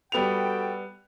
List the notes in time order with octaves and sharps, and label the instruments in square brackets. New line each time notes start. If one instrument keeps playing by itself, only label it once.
[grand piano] G3 B3 F7 [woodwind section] F#4 A4 G5